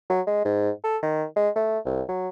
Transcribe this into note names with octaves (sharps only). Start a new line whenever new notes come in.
F#3
G#3
G#2
A4
D#3
G#3
A3
C2
F#3